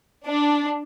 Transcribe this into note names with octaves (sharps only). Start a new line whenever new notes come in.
D4